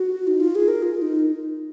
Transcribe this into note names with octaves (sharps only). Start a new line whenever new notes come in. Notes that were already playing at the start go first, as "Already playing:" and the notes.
Already playing: F#4
D#4
F4
G#4
A#4
F4
D#4